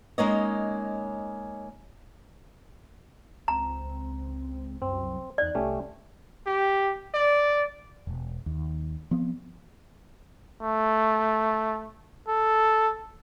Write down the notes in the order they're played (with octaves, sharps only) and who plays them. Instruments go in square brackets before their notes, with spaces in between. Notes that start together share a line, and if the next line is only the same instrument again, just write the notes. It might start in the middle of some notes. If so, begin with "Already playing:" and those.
[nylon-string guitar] G#3 A#3 C#4 D#4 C#5 D#5
[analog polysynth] C#2 C4 [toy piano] A#5
[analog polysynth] C2 F#2 [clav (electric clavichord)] C4
[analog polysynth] E2 D#4 F#6 [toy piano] D5
[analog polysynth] C2 [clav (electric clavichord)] A3 C#4 G4
[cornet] G4
D5
[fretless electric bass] E1
D#2
F3 B3 C4
[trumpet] A3
A4